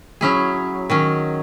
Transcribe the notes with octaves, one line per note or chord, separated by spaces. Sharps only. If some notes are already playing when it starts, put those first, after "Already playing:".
F#3 C#4 E4 G#4
D#3 F#3 C#4